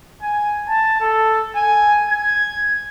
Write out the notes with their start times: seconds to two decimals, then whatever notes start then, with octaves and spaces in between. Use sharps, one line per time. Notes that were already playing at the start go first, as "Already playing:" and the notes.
0.22 G#5
0.69 A5
1.01 A4
1.56 G#5
2.09 G#6